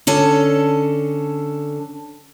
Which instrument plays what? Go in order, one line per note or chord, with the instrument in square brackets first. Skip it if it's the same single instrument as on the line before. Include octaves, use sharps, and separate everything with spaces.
[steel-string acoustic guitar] D3 C#4 A4